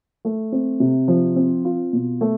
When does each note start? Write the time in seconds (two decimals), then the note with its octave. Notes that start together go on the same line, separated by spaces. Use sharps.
0.25 A3
0.52 C4
0.80 C3
1.08 F3
1.36 C4
1.65 F4
1.93 B2
2.21 A3